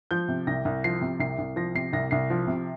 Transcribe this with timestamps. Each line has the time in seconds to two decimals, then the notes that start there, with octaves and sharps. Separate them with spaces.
0.11 F3 G6
0.28 C3
0.47 C2 A#6
0.65 C2
0.84 F3 C7
1.02 C3
1.20 C2 C7
1.38 C2
1.56 F3 A#6
1.75 C3 C7
1.93 C2 A#6
2.11 C2 C7
2.30 F3
2.47 C3